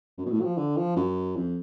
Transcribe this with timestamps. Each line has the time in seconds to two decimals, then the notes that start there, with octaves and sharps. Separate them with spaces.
0.18 F#2
0.26 B2
0.31 A2
0.40 F#3
0.44 F3
0.58 D3
0.77 F3
0.96 F#2
1.36 F2